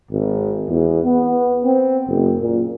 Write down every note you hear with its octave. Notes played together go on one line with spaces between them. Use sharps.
G#1
E2
B3
C4
F#1
A#2